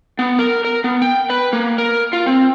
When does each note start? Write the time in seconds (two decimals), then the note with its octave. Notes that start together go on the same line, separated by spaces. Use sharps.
0.19 B3
0.39 A#4
0.65 A#4
0.84 B3
1.02 G5
1.30 B4
1.53 A#3
1.78 A#4
2.13 F4
2.26 C4